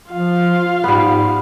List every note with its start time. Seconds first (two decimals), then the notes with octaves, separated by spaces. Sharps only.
0.12 F3 F4 F5
0.84 G#2 G3 B3